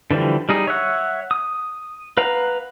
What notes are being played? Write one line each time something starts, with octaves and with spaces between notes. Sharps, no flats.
D3 E3 F3 G3
G3 D#4 G#4
C#5 E5 F#5
D#6
B4 F5 F#5 A#5